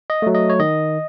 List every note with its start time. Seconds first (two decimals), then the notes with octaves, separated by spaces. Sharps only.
0.10 D#5
0.22 F#3 A3
0.35 D#5
0.50 C#5
0.60 D#3 D#5